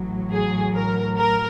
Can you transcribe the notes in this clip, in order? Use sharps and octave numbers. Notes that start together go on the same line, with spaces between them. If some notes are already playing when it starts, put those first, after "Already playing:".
Already playing: A1 A2 F#3
G#4
A#4
A#4